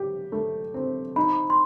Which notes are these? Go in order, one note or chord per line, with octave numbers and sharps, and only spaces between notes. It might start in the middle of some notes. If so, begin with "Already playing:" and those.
Already playing: G4
A3
C4
D#4 B5
C6